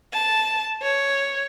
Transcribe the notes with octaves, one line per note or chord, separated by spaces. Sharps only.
A5
C#5